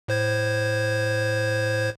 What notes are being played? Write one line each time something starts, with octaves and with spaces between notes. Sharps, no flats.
A2 C5 G#6